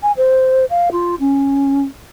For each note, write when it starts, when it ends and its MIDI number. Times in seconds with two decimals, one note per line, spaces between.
0.02 0.12 80
0.17 0.65 72
0.70 0.89 77
0.91 1.15 65
1.20 1.83 61